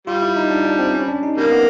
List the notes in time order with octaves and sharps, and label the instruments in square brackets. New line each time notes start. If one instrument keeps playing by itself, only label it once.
[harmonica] G3 [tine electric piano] F4
[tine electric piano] E4
D#4
D4
D4
C4
C#4
D4
D#4
[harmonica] G3 A#3 [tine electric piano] B3
[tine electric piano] B3